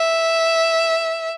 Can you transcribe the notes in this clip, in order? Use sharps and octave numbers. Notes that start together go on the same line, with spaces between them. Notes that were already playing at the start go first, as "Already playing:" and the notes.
Already playing: E5